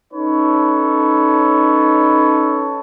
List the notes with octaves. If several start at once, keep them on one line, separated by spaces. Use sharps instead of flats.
C#4 D#4 A4 B4 C#5